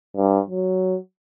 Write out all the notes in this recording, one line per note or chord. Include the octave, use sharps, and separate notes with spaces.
G2
F#3